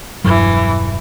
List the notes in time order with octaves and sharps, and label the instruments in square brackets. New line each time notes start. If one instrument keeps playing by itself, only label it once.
[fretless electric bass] E1 G2 F#3 [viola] E3